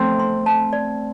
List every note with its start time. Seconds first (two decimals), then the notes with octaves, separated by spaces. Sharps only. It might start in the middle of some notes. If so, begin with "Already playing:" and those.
Already playing: A3 C4
0.20 C6
0.46 A5
0.73 D5